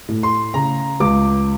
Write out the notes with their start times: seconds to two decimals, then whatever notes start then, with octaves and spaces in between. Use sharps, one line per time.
0.08 A2
0.23 C6
0.54 C#3 A#5
1.00 C#2 D6